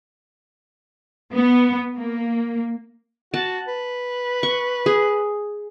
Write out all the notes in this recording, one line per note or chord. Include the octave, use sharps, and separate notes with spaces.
B3
A#3
F#4 A5
B4
C#6
G#4